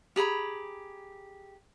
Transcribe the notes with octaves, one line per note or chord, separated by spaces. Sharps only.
G4 G#4 A#5 B5